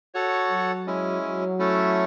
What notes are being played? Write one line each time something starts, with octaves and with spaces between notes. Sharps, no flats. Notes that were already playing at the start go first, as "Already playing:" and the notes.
F#4 A4 C#5
F#3
G#3 C#4 E4
F#3
A3 C#4 E4 A4